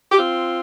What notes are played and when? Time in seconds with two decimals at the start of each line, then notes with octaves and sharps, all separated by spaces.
0.12 G4
0.17 C4 F4